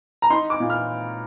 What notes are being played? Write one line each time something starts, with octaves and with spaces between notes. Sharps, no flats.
A#5
D#4 C6
D6
A#2
F6